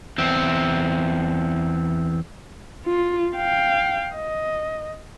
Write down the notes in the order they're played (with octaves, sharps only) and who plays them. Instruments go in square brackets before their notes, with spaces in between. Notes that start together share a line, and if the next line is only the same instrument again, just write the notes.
[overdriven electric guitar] E2 C4
[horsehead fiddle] F4
F5 G5
D#5